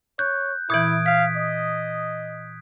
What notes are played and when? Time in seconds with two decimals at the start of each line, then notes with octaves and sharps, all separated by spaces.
0.19 C#5 F#6 G6
0.70 A#2 E3 E4 D#6 G#6 D7
1.06 F5 B6
1.37 D#5